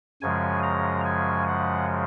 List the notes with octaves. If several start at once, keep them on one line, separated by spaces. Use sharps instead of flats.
F#2 C#3 F3 G#3 G#5
A#5
G#5
F#5